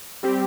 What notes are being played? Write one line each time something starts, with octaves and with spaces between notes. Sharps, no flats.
G3 C4 G4